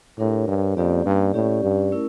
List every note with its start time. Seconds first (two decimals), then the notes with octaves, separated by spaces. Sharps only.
0.19 A2 D4 G4 A#4 C#5
0.48 G2
0.77 F2 A#3 C#4 G4 D5
1.06 G2
1.34 A2 C#4 G4 D5
1.64 G2
1.92 A3 C#4 E4 A#4